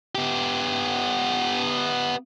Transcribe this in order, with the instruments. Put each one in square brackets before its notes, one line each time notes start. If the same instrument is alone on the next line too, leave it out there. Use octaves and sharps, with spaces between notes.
[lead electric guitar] B3 G4